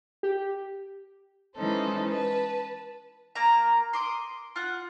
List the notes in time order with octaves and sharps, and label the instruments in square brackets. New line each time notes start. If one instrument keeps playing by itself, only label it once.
[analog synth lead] G4
[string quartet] E3 G#3 C#4 D#4 A4 C5
B4 A5
[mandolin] A#3 A#5
C6 D6 D#6
F4 F#5